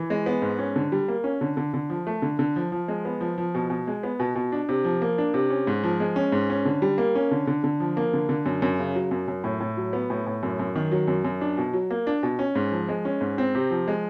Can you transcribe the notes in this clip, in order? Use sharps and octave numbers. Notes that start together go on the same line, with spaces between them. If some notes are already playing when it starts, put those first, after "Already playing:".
Already playing: E3
G#3
B3
G#2
C#4
D3
G3
A#3
C#4
D3
D3
D3
F3
A3
D3
D3
F3
F3
G#3
B3
F3
F3
B2
B2
G#3
B3
B2
B2
D4
C3
F3
A#3
D4
C3
C#4
G#2
F3
G#3
C#4
G#2
C#4
D3
G3
A#3
C#4
D3
D3
D3
F3
A#3
D3
D3
F#2
F#2
C#3
F#3
F#2
F#2
A2
A2
F#3
B3
A2
A2
F#2
F#2
D#3
F#3
F#2
F#2
D4
B2
F#3
A#3
D4
B2
C#4
G#2
F3
G#3
C#4
G#2
C4
C3
F3
G#3